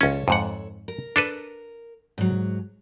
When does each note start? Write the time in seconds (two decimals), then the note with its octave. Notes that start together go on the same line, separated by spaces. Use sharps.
0.01 C#2 C#4 A4 C#5
0.28 F2 G#2 F#5
0.88 A#4
1.16 D4 A4 B4
2.18 G#2 F#3